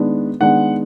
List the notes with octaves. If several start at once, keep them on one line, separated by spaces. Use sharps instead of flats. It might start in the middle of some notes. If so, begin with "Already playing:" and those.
Already playing: D#3 G#3 B3 D4
D#3 G#3 B3 D4 F#5